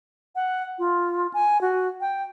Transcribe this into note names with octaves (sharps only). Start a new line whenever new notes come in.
F#5
F4
G#5
F#4
G5